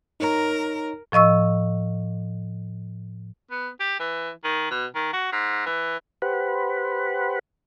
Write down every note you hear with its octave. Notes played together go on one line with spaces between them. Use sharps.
D#4 A#4 C#5 A#5
A2 F3 D#5 C#6 E6
B3
G4
E3
D#3
B2
D#3
F#4
G#2
E3
G4 B4 C5 F#5 B5